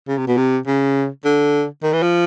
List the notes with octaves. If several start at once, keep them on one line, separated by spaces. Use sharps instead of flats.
C#3
C3
B2
C3
C#3
D3
D#3
E3
F3